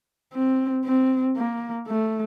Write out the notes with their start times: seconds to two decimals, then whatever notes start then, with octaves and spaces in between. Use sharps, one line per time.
0.34 C4
0.85 C4
1.37 A#3
1.88 A3